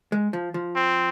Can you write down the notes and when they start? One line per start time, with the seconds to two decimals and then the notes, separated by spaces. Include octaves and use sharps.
0.12 G#3
0.33 F3
0.54 F3
0.76 C4